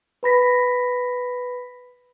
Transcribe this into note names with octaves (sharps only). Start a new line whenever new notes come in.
B4 B5 A#6 B6